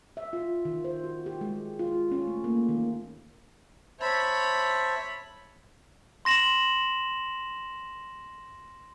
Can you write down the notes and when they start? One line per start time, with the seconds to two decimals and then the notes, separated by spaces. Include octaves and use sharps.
0.17 E5
0.33 F4
0.65 D#3
0.85 C5
1.04 F#4
1.26 G4
1.41 G#3
1.79 F4
2.12 C#4
2.27 A3
2.44 A#3
2.69 D#3
4.01 C5 C#5 E5 A5 B5
6.25 C6 A#6 E7 F#7